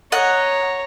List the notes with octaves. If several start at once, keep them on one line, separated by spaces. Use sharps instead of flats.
C#5 D#5 F#5 A#5